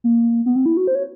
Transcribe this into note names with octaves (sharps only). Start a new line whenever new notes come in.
A#3
B3
C4
E4
F#4
C5
C#5